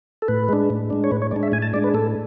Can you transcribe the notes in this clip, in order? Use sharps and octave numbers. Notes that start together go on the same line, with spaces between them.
A4
A2 B4
G#3 D4
A2
G#3 D4
C#5
A2 B4
C#5
G#3 D4 D5
E5
A2 G#5
A5
G#3 D4 D5
B4
A2 A4